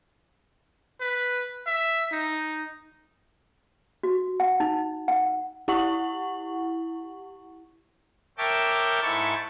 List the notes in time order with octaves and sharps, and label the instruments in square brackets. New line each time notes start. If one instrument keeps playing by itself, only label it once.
[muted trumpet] B4
E5
D#4
[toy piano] F#4
F#5
D#4
F#5
[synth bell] E4 G4 F#5 C#6 F#7
[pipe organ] A#4 C#5 E5 G5 A5 D6
G#2 E4 A4 A5 C#6